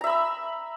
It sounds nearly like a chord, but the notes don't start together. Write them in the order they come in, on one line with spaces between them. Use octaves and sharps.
A#5 E5 B5 E6